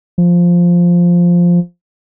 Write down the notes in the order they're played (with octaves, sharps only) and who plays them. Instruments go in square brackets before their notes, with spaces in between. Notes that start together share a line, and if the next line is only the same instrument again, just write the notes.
[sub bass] F3